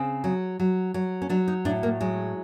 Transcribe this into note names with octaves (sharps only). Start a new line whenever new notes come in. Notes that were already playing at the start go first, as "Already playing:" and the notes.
Already playing: C#3 C4
F#3
F#3
F#3
C#4
F#3 D4
D#4
A2 D4
A#3
F#3 G#3